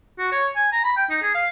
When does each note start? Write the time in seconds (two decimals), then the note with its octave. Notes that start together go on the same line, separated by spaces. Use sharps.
0.18 F#4
0.32 C#5
0.56 G#5
0.72 A#5
0.84 B5
0.96 G5
1.10 D#4
1.22 G#4
1.34 F5